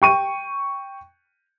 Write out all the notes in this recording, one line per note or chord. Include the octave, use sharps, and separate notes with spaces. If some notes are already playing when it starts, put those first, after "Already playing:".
G5 C#6 D#7